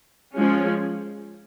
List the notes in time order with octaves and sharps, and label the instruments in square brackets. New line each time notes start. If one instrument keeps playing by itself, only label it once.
[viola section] F3 G#3 C#4